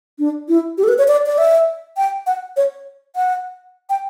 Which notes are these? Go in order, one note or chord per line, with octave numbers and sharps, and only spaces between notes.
D4
E4
G4
A4
B4
C#5
D5
D5
E5
G5
F#5
C#5
F#5
G5